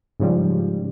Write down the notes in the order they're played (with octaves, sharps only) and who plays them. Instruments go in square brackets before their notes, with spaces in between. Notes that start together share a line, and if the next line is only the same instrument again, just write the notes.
[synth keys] G#2 C#3 F3 G3